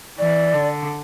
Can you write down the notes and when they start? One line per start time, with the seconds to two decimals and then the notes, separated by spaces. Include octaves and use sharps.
0.19 E3 D5
0.54 D3